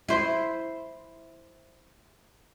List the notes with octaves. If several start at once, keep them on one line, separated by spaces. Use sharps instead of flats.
E4 C5